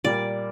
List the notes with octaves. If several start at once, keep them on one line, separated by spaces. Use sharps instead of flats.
A#2 G3 A#3 D5